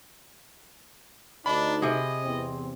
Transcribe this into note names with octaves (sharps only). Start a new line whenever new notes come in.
D2 D4 D#4 B5
C3 G#4 D#5
E2 C4